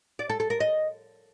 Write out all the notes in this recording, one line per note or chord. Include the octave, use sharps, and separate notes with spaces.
D5
A4
A4
A#4
D#5